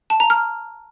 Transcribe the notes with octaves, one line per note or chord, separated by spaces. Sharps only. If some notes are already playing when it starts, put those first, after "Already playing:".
A5
A#5
F6